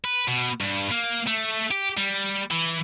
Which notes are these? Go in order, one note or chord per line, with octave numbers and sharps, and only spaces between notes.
B4
B2
G2
A#3
A3
G4
G3
E3